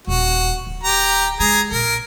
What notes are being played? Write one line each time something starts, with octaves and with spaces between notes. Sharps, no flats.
D#1 F#4
D1
G4 A#5
G#3 G#4 G#5 A#5
A#1 A#4